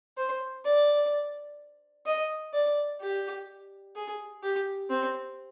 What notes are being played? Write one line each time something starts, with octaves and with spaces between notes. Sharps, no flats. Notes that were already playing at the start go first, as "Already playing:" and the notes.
C5
D5
D#5
D5
G4
G#4
G4
C4